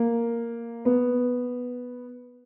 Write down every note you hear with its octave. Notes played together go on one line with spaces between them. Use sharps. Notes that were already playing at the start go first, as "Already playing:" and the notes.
Already playing: A#3
B3